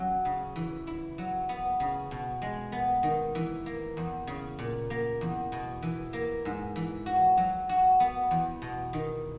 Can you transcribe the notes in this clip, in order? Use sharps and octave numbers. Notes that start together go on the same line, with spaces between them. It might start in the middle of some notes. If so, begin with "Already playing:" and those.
Already playing: F#3 C#4
C#3
E3
E4
F#3
B3
C#3
B2
G#3
B3
D#3
E3
A#3
E2
C#3
A#2
A#3
E2
B2
E3
A#3
G#2
E3
F#4
F#3
F#4
B3
E2
B2
D#3